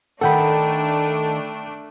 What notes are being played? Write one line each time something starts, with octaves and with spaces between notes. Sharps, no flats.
D#3 A3 D4 A4 F#5 G5 B5